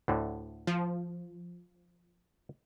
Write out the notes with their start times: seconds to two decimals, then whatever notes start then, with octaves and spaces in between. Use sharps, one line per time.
0.08 D2 A2 D3
0.67 F3